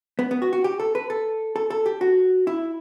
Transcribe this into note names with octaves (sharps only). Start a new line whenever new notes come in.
B3
B3
F#4
F#4
G4
A4
B4
A4
A4
A4
G4
F#4
E4